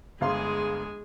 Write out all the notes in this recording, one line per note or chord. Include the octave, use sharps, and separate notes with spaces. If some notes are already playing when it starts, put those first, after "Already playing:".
G1 G#3 G#4 F5 C6